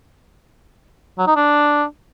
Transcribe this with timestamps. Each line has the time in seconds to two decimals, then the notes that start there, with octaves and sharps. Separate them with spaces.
1.18 F#3
1.27 D#4
1.36 D4